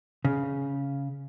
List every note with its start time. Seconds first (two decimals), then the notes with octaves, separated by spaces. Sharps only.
0.25 C#3